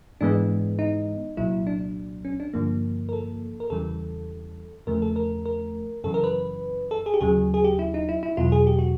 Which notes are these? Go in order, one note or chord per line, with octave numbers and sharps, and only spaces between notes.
G#2 E3 G#3 B3 D4
D#4
C2 A#2 F#3 E4
D4
C#4
D4
G2 D3 F3 A#3
A#4
A4
A#4
E2 C#3 E3 G3 A4
E2 C#3 F3 A3 A#4
A4
A#4
A#4
F#2 C#3 E3 A4
A#4
B4
A4
G#4
G4
D#2 C#3 F#3 G#4
G#4
G4
E4
D#4
E4
E4
E2 B2 F#3 F4
G#4
G4
F#4